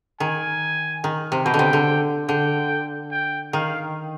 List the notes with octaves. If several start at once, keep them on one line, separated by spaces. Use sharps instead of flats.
D#3 G#5
D#3
C3
B2 G5
D3
C3
D3
D3 G5
G5
D#3 F5